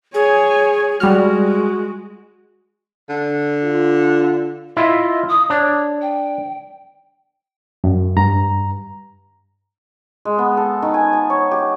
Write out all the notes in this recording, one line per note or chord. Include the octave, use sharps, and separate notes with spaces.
G#4 C#5 G#5
G3 G#3 F#4 F6
D3
F4
E4 F4 D#5 E5
D#6
D4 C#5
G5
F#2
G2 A#5
G#3
B3
A4
D#3
G#5
A5
C#5
G4